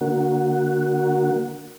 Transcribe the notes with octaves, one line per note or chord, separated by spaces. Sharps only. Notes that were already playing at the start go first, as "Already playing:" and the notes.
D3 A#3 F#4